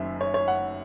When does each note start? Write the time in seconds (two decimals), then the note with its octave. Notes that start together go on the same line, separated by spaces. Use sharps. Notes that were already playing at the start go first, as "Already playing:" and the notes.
Already playing: F#1 F#2 D#3 E5
0.21 C#5
0.34 C#5
0.48 F#5